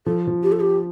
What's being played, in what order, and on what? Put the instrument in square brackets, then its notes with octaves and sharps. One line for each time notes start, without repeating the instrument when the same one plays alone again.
[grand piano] F3 [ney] A4
[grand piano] F3
[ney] G4
A4
G4